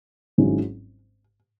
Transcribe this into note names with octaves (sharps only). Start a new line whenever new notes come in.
G#1 G#2 F#3 C#4 E4